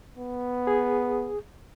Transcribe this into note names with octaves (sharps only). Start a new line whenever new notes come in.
B3
G#4